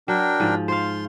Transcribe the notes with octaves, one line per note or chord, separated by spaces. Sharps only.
F#3 D4 A#4 G5
G#2 F3
F4 C5 F5 C6